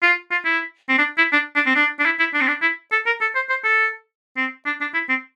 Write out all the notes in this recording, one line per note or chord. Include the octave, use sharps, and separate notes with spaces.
F4
F4
E4
C4
D4
E4
D4
D4
C4
D4
D4
E4
E4
D4
C4
D4
E4
A4
A#4
A4
C5
C5
A4
C4
D4
D4
E4
C4